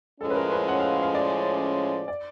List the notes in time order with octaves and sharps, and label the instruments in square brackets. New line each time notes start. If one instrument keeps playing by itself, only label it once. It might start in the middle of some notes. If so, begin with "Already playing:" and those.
[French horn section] A2 F3 G#3 C#4 [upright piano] A4
[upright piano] B4
A#4
B4
F#5
F5
F#5
F5
D5
D5